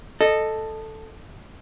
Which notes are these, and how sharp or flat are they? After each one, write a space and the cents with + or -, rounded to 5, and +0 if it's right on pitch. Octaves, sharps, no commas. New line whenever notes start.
A4 +0 D#5 -15